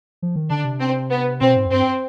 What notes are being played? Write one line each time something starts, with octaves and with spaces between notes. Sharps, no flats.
F3
D#3
D3 D4
C3
C4
B3
B2 C4
G#2
F2
G2 C4